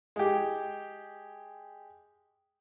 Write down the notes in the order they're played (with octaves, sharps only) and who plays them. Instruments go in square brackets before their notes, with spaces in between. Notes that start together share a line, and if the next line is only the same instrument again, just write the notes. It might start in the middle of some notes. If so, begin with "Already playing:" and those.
[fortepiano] G#3 G4